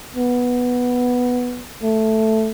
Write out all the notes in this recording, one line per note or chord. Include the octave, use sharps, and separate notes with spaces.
B3
A3